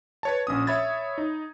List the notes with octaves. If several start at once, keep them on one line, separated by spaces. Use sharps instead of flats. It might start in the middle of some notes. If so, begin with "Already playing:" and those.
B4 C#5 A5
A#1 C#4 D#6
C#5 E5 B5 G#6 A6
D#4